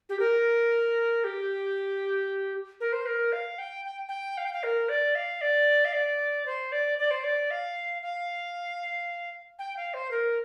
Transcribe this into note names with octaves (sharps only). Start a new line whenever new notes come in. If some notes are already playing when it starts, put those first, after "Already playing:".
G4
A#4
G4
A#4
C5
A#4
F5
G5
G5
G5
F5
G5
F5
A#4
D5
F5
D5
F5
D5
C5
D5
D5
C5
D5
F5
F5
G5
F5
C5
A#4